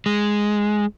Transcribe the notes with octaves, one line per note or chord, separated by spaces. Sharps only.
G#3